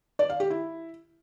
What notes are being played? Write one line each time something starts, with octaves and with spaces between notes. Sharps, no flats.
D5
F5
G4
E4